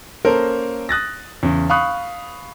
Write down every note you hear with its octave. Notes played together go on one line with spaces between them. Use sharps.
A#3 C#4 A4 A#4 C5
D#6 F#6 A6 A#6
E2 C#3
F5 B5 C#6 D#6 F#6